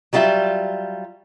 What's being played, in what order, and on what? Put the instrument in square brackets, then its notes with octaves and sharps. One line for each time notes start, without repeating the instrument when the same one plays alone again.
[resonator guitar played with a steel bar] F#3 G3 D4 F4 E5